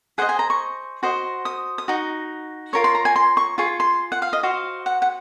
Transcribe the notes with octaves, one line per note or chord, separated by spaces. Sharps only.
G#4 C5 D#5 F#5
G#5
A#5
C#6
F#4 C5 D#5
D#6
D#6
D#4 F#4
F4 A#4 C#5 C#6
C6
A#5
G#5
C6
C#6
F4 G#4 C#6
C6
F#5
F5
D#5
F#4 C5 D#5 F5
F#5
F#5